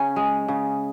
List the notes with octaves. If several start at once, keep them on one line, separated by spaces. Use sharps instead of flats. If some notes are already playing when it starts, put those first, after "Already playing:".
Already playing: C#3 C#4
G#3
C#3